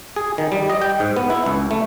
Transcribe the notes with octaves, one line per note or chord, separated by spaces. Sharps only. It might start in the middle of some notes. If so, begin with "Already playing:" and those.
G#4
D#3
G3
D#5
G5
G#2
B3
E4
C#2
A3